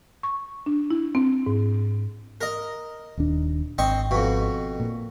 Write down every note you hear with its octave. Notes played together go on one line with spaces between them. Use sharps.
C#6
D4
E4
C4
G#2
A#4 D#5
D#1 D#2 D4
G#1 C4 D#5 C#6
F2 B2
A#2